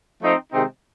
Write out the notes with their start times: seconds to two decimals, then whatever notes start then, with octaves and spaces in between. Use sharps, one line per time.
0.22 F3 A3 C4 D#4
0.52 C3 D#3 G#3 C4 D#4